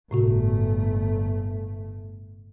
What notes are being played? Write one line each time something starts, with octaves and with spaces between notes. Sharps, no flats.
G1 A2 C3 A3 F#4